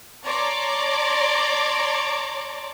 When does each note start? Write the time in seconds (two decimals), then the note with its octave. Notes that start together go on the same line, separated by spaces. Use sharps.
0.23 C#5 D5 A5 A#5 C6 D6